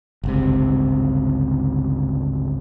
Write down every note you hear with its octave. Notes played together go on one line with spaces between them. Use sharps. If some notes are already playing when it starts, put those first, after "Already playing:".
G1 C#2 C3